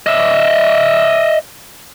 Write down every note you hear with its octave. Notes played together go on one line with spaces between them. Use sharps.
D#5 E5